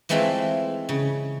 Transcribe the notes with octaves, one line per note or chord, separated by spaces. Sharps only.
E3 G#3 A3 C4 E4 F4
C#3